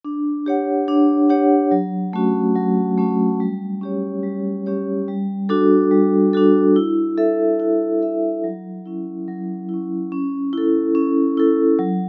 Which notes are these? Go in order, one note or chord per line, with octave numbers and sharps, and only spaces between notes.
D4
G4 C#5 F#5
D4
G4 C#5 F#5
F#3
A3 C#4 F#4
F#3
A3 C#4 F#4
G3
C#4 G4 C#5
G3
C#4 G4 C#5
G3
D4 F#4 A4
G3
D4 F#4 A4
E4
A4 E5
E4
A4 E5
F#3
C#4 E4
F#3
C#4 E4
C#4
E4 A4
C#4
E4 A4
F#3